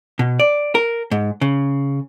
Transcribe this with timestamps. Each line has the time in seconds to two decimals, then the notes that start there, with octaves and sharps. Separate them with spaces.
0.19 B2
0.40 D5
0.75 A#4
1.11 G#2
1.41 C#3